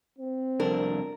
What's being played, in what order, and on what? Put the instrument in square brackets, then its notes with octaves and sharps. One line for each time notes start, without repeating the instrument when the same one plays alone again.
[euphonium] C4
[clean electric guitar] C2 F2 D4 [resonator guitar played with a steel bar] A#4